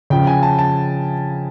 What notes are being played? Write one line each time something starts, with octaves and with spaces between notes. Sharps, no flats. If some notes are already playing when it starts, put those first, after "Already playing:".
C#3 F3 G5
G#5
A5
A5